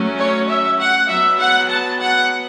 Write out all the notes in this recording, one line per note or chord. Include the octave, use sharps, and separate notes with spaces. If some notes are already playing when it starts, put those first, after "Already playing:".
Already playing: F#3 A3 C#4
C#5
E5
F#5
F#3 B3 E5
F#5
A5
F#5